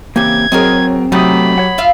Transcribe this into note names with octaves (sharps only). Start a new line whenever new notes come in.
C#3 E3 A#3 C4 G4 G#6
F#3 C4 G#4 A#4 C#5 D#5
C3 F#3 A3 D#4 G4 B5 D#6
C#5 F#5
F4 E5 F5